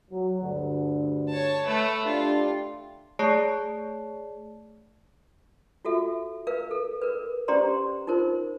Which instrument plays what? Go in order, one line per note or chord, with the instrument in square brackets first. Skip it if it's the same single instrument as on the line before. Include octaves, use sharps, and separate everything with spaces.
[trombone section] F#3
D2 G2 D3
[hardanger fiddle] C#5 A5
A3 B4
[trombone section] D4 G4 [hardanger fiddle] F4
[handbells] A3 G#4 C#5 D5 A5 C7
[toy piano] F4 F#4 A4 E5
A#4 B4 F5
A4
A#4 B4
C#4 G4 C5 D5 A#5 C6
D#4 F4 A#4 C5